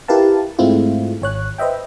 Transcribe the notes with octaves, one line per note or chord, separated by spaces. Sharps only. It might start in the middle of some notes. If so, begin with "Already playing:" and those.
E4 G4 A#4 B4 F5 A5
G#2 G#3 A3 C4 E4 F4
G#1 C#5 F#6
B4 C5 D#5 E5 G5